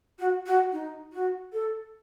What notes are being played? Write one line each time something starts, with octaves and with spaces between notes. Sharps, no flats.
F#4
F#4
D#4
F#4
A4